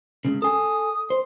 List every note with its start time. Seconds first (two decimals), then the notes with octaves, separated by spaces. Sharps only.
0.25 C#2 G2 C#3
0.42 A4 G#5 D#6
1.10 C5